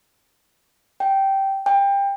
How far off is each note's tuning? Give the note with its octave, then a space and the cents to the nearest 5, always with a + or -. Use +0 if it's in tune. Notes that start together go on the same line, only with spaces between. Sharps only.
G5 -10
G5 +25